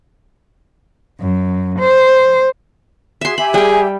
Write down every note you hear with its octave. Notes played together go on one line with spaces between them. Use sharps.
F#2
C5
F#4 G#4 E5 C6
G4 E5 G#5 B5
G3 G#4 G5